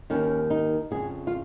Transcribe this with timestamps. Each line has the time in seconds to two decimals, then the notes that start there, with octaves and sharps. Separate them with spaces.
0.10 D#2 D#3 C#4
0.50 D#4
0.91 F2 C#3 G#4
1.27 F4